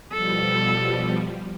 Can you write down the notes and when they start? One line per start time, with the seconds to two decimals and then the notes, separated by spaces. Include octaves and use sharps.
0.13 B2 F3 G3 A4